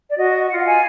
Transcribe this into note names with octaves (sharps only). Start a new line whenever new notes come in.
D5
F#4 D#5
F4 F#5
F#5
G#5